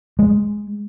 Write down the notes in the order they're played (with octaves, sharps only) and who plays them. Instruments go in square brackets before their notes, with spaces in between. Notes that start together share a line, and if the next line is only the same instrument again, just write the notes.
[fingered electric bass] G#3